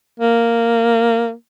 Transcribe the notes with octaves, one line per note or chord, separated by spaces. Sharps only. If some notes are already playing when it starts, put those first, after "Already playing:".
A#3